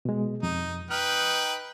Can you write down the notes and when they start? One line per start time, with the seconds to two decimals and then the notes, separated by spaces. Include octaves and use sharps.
0.05 B2 G#3
0.43 F2 D#4
0.91 D#4 B4 G5 F6